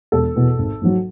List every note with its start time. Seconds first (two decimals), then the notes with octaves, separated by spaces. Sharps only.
0.12 E1 A4
0.35 E2 B2
0.58 G#1
0.81 G#2 F#3